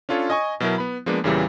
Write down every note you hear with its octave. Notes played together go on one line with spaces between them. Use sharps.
C#4 D4 F4 A4 C#5
D#5 G#5 C#6
B2 F#3 E4 A#4
B3 B5
F3 G#3 A#3 B3 D4
E2 A#2 C#3 E3 G3